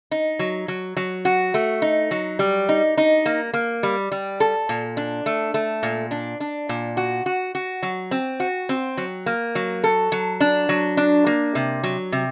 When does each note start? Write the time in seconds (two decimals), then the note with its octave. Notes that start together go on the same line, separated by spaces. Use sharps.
0.11 D#4
0.39 F#3
0.68 F#3
0.97 F#3
1.25 F#4
1.54 A3
1.82 D#4
2.11 F#3
2.39 G3
2.69 D#4
2.97 D#4
3.26 A#3
3.53 A#3
3.83 G3
4.12 G3
4.40 A4
4.69 A#2
4.97 D4
5.26 A3
5.54 A3
5.83 A#2
6.11 D4
6.40 D4
6.69 A#2
6.97 F#4
7.26 F#4
7.55 F#4
7.83 F#3
8.11 C4
8.40 F#4
8.69 C4
8.97 F#3
9.26 A#3
9.55 F#3
9.84 A4
10.12 F#3
10.40 D4
10.69 F#3
10.97 D4
11.26 A#3
11.55 C3
11.83 F#3
12.12 C3